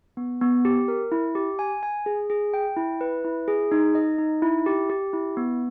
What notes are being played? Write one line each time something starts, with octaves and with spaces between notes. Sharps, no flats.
B3
B3
G4
A#4
E4
G4
G#5
G#5
G#4
G#4
G5
E4
B4
E4
G#4
D#4
D#5
D#4
E4
G4
G4
E4
B3